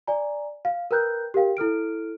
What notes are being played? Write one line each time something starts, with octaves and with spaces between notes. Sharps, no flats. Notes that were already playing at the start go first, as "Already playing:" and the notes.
D5 G#5 A#5
F5
A#4 B4 G5 A#5 F#6 G6
G4 A#4 F5 G5
E4 A4 F6 D7